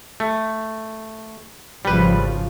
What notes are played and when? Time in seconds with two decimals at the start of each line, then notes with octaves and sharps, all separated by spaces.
0.20 A3
1.85 G#1 C#3 F3 G3 B4